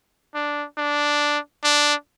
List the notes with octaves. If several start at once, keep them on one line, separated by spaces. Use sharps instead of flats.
D4
D4
D4